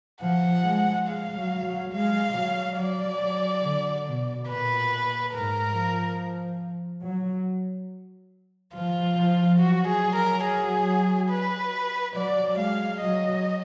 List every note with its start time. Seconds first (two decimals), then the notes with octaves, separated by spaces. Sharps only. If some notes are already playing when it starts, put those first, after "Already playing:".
0.22 F3 F#5
0.65 G#3
1.07 G#3 F5
1.36 F#3
1.64 F#3
1.93 G#3 F5
2.35 F#3
2.78 F#3 D5
3.07 F#3
3.63 D3
4.06 B2
4.49 A#2 B4
5.33 G#2 A#4
5.76 F3
7.04 F#3
8.75 F3 F4
9.17 F3
9.59 F#3 F#4
9.88 G#4
10.03 F#3
10.16 A#4
10.44 G#4
11.29 B4
12.16 F#3 D5
12.58 G#3 F5
13.00 F#3 D#5